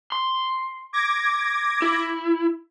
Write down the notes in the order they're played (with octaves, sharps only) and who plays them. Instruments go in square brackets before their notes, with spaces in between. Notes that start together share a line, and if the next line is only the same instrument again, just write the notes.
[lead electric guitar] C6
[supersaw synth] D6 G#6 A#6
[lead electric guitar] E4